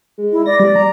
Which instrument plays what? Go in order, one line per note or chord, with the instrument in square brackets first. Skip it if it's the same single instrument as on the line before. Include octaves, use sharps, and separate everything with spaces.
[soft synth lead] G#3
[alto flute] E4
[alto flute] D5 [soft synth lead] A#6
[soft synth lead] G3
A#5